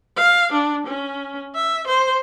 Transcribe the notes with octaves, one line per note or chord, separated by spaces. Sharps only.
F5
D4
C#4
E5
C5